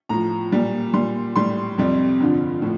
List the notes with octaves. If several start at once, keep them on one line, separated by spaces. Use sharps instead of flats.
A2 F3 A#5
A#2 G3
A#2 G3 C6
A2 G3 C6
F2 C3 G3
G2 D3 F3
A2 F3